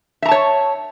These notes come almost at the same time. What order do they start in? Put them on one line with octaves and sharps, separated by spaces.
E5 A#5 A5 C#5